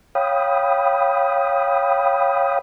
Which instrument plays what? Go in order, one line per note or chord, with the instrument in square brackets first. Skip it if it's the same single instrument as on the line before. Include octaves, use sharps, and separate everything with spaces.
[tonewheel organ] C#5 F5 G5 B5 D#6